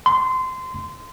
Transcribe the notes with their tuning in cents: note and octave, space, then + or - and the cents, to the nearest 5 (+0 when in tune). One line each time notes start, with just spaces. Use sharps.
C6 -20